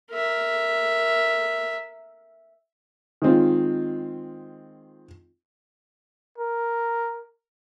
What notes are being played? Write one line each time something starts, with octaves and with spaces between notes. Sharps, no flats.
A#4 E5
D#3 G#3 C4 F4
A#4